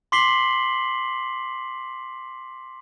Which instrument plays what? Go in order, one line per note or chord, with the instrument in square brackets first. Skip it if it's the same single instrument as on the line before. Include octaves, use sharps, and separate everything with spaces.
[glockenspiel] C6 D6 B6 C7 F#7 G7